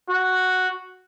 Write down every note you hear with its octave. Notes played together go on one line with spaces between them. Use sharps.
F#4